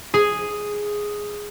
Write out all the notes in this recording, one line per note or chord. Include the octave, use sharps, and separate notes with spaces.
G#4